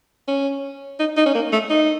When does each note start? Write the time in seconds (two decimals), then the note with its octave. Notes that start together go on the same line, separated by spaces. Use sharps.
0.28 C#4
0.99 D#4
1.17 D#4
1.26 C#4
1.35 A#3
1.52 A3
1.70 D#4